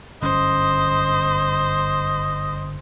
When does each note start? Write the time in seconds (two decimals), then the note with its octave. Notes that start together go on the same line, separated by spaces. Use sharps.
0.22 G1 F#2 C#4 C5 D#5